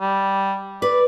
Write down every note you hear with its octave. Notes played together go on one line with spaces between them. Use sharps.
G3
B4 D5